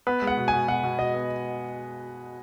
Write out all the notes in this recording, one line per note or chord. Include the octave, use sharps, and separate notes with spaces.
B3 B4
G#3
F#5
B2
G#5
B2
B2 F#5
B2
B2 D#5
B3